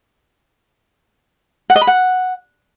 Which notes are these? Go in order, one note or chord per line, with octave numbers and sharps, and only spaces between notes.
F#5
D#5
B5
F#5